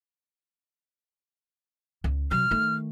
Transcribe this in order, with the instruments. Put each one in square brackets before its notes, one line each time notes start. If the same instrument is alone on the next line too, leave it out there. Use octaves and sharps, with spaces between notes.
[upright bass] C#2
[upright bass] C3 F#3 [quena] F6
[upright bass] D#3 A3